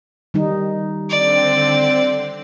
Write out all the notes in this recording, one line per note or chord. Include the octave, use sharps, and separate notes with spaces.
D#3 G3 D#4
D3 C4 D5